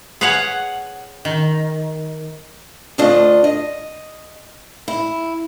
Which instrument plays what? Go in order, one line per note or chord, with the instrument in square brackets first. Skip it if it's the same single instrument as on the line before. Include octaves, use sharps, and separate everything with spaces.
[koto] G#4 B4 C#5 F5 F#5
D#3
[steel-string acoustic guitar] D2 A3 D4 F4 D#5
D#5
E4